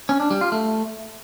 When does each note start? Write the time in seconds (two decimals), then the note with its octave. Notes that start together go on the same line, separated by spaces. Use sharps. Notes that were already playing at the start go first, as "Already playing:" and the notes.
0.09 C#4
0.20 D4
0.30 G3
0.41 F4
0.52 A3